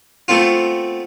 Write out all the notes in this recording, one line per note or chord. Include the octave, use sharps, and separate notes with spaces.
A3 B3 C4 F4